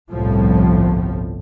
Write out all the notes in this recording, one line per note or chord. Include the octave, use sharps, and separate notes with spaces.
G1 C2 A2 F3